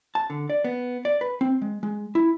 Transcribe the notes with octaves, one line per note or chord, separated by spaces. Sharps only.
A5
D3
D5
B3
D5
B4
C4
G#3
G#3
E4